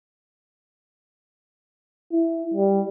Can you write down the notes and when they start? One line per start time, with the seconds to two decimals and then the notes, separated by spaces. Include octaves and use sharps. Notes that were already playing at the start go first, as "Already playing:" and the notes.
2.12 E4
2.54 G3